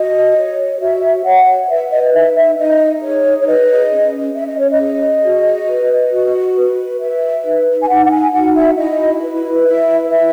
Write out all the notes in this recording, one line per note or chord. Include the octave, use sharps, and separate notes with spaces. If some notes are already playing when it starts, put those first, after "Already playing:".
Already playing: F#4 D#5
C#5
F#4 E5
C#5 F#5
B4 E5
D#5
D#5
D#4 E5
E5
D#4 D#5
G#4 C#5
C#5
B4 D#5
C#4
C#4 E5
D#5
C#5
D#5
G#4
F#4
B4
F#4
B4
B4 E5
D#4
G#5
D#4 F#5
F#5
G#5
F#4 F#5
E5
E4 D#5
B4
E4 E5
B4 E5